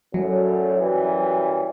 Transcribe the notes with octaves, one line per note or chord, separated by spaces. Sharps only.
F#2 A2 D3 F#3
F#2 E3 G3